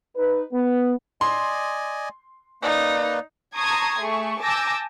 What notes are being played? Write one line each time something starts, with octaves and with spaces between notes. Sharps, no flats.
D#4 B4
B3
D5 D#5 G#5 C6
A#3 D#4 B4 D5
A5 A#5 C6 C#6 D#6 G#6
A3 G#4 C#6
G#5 A5 D6 E6 G6 A#6